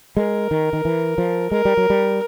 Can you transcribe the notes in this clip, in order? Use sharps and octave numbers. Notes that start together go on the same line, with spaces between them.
G#3 A#4
D#3
D#3
E3
F3
G#3 A#4
G3
F#3
G3